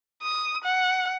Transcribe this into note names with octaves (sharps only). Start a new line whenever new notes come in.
D#6
F#5